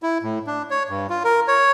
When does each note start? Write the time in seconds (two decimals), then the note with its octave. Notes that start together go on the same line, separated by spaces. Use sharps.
0.03 E4
0.23 A2
0.47 D4
0.70 C#5
0.89 G2
1.10 F4
1.25 A#4
1.48 C#5